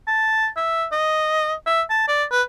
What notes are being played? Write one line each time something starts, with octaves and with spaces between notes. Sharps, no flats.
A5
E5
D#5
E5
A5
D5
B4